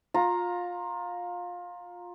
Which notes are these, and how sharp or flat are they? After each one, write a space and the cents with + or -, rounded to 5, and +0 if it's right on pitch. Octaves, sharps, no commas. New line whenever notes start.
F4 +20 A#5 +0